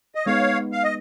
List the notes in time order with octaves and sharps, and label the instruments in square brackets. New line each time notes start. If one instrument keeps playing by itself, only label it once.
[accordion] D#5
[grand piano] G#3 B3 D#4 G#4 [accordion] C#5 F5
[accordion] F5
D#5